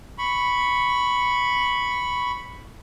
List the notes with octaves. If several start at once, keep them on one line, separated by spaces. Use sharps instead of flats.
B5 C#6